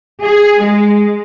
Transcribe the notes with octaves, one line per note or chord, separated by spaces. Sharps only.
G#4
G#3